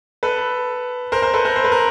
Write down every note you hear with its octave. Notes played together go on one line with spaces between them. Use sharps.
A4 B4
A#4 C5
A#4 C5
A4 B4
A#4 C5
C5
B4
A#4